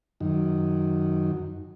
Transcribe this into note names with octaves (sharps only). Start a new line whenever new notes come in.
F#2 D#3